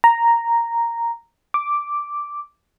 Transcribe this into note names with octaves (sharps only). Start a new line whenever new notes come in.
A#5
D6